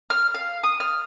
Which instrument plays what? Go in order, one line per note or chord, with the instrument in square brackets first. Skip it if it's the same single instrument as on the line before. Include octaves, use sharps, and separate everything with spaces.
[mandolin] F6
F5
D#6
F6